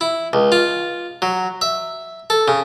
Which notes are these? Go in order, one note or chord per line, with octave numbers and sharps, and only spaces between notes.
E4
C#2
F4
F#3
E5
A4
C#3